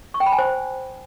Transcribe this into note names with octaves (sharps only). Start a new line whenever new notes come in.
C#6
G5
B5
G#5
C5